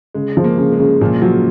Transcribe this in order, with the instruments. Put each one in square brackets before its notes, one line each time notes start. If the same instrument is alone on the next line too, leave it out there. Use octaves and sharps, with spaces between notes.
[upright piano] C#3 [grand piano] G#3
[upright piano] F3
[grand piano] A#3
[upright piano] C#3
[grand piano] G#3
[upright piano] C#3
[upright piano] A#2 [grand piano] F3
[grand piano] F3 [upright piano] F#3